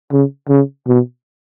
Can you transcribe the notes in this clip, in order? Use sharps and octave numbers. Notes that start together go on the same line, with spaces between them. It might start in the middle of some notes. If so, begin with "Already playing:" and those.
C#3
C#3
B2